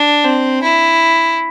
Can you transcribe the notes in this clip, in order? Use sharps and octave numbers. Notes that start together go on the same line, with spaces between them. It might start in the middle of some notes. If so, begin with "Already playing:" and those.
Already playing: D4
C4
E4